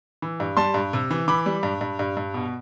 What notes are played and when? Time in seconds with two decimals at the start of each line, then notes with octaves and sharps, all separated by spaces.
0.22 E3
0.40 G2
0.57 G3 A5 C6
0.74 G2
0.93 C3
1.11 E3
1.28 E3 B5 D6
1.46 G3
1.63 G2
1.81 G2
1.99 G2
2.17 G2
2.34 B2